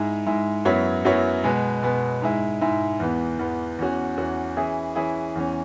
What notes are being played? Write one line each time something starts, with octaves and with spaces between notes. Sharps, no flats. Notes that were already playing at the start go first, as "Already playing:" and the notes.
Already playing: G#2 G#3 E4
G#2 G#3 E4
F#2 F#3 B3 E4 C#5
F#2 F#3 B3 E4 C#5
B2 G#3 B3
B2 G#3 B3
G#2 G#3 E4
G#2 G#3 E4
E2 E3 B3
E2 E3 B3
E2 E3 C#4 F#4
E2 E3 C#4 F#4
E3 C#4 E4 G#4
E3 C#4 E4 G#4
E2 E3 C#4